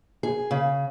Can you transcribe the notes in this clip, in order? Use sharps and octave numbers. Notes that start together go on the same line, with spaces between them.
G#4
C#3